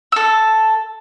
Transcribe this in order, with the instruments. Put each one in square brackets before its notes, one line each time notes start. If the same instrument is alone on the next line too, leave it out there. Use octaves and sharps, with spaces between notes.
[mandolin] A4 E6